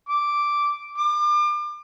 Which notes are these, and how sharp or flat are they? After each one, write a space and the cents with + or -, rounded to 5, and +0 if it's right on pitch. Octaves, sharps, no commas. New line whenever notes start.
D6 -5
D6 +35